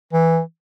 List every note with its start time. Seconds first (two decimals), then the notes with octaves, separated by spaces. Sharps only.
0.13 E3